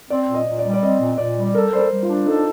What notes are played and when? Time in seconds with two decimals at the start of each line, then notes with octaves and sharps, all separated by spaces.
0.10 C4 D5
0.28 A#2
0.34 D#5
0.47 A#2
0.59 D5
0.64 G3
0.74 D5
0.82 C4 D#5
1.00 A#2
1.18 A#2 D5
1.37 G3
1.54 A4 A#4
1.73 G3 C5
1.79 A#4
1.91 G3
2.03 F4
2.09 D4
2.26 D#4 A4